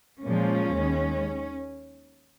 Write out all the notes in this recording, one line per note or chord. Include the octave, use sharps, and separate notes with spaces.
A#2 F3 G#3 C#4
D#2 D#3 G#3